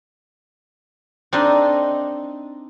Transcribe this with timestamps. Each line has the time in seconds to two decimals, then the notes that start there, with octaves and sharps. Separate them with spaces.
1.33 C4 D4 D#4 A4 D#5